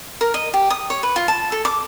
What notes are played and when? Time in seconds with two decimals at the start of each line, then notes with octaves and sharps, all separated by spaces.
0.21 A#4
0.34 D#5
0.54 G4
0.70 D#6
0.90 C#5
1.03 B4
1.16 F4
1.28 A5
1.52 A4
1.65 D6